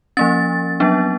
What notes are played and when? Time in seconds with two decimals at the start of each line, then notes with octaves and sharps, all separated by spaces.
0.17 F3 A#3 C#4 A6
0.80 F#3 B3 D4